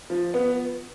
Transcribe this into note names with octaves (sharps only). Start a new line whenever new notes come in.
F3
B3